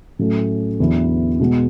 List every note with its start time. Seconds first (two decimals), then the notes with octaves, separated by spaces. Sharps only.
0.19 A2 F#3 A3 C#4
0.80 E2 D3 F#3 B3 E4
1.40 B2 G#3 B3